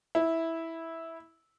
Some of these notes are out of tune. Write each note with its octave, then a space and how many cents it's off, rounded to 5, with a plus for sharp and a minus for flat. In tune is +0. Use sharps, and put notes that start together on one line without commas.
E4 -10